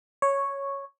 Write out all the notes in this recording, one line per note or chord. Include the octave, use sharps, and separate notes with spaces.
C#5